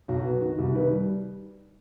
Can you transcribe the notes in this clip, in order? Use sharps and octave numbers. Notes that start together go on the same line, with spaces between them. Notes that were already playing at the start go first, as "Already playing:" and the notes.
B1 F#4
B3
D#3 F#4
C2
D#3 B4
G3